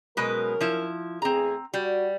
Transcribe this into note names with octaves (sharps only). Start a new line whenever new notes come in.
B2 F#3 G#3 C#4 A#4 B4
F3 E4
E2 A3 C4 G#4 A#5
G3 F#4